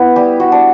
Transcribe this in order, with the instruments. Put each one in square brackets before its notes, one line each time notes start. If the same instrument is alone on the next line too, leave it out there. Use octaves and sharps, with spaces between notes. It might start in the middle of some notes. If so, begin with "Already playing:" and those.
Already playing: [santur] B3 E4 B4
G3 G4
F#4
D4